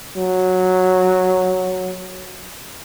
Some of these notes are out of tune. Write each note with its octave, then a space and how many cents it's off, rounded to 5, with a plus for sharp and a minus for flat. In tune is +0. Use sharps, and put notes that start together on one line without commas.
F#3 -5